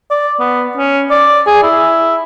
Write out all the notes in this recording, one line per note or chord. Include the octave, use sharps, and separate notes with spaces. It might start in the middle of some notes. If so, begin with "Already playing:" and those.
D5
B3
C#4
D5
G#4
E4